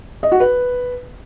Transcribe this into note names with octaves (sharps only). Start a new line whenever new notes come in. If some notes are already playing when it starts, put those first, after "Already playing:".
D#5
F#4
B4